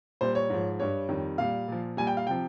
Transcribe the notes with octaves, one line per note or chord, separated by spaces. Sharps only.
A#2 G3 C5
C#5
G#2 F3
G2 G3 C#5
F2 D#3 G3
A#2 G3 F5
A#2 F3
A#2 G3 G#5
G5
F5
C3 F3 G5